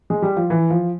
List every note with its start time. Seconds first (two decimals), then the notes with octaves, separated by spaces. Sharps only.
0.10 G#3
0.22 G3
0.37 F3
0.50 E3
0.70 F3